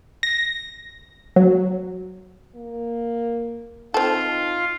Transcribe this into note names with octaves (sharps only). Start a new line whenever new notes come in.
A#6
F#3
A#3
C4 D#4 F4 A4